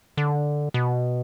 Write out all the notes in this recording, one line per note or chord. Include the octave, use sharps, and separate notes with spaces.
D3
B2